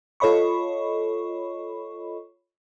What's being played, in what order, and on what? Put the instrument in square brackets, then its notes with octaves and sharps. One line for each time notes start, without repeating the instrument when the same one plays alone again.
[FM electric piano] F4 A4 C#5 D#5 B5 C#6